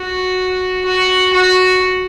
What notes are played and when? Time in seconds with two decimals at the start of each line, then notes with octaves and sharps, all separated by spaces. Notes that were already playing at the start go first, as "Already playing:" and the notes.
Already playing: F#4
0.85 F#4
1.33 F#4